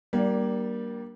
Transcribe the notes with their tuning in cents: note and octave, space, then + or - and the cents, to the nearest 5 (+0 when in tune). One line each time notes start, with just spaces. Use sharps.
G3 -20 A#3 +15 D4 +0